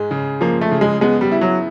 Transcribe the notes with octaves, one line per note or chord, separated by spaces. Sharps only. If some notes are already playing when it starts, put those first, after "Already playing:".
Already playing: G#2 G#3
C#3
F3 A#3
A3
C#3
G#3
G#3 B3
G3
E4
F#3